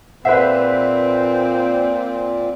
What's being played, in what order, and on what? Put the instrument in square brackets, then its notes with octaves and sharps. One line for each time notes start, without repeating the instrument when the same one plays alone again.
[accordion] A#2 [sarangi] C4 [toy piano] G#4 F#5 [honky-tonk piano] B4 C5 E5